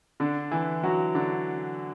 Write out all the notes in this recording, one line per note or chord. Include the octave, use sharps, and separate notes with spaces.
D3 D4
E3 E4
F#3 F#4
D3 D4